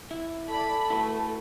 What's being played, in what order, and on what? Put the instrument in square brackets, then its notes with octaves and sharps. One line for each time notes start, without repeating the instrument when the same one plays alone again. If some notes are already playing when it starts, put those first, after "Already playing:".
[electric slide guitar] E4
[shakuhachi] A4 [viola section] D5 B5 [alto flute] A5
[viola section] A3 [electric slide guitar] E4 F#4 B4